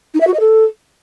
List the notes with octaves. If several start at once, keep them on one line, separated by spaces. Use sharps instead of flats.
D#4
E5
F#4
D#5
A4